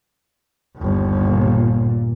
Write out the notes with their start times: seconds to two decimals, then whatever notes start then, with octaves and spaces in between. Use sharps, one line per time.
0.77 G1 D#2
1.16 A#2